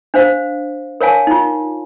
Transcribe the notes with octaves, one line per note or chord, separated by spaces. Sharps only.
D4 C5 F5
A#4 C#5 F5 G#5 A5
D#4 F4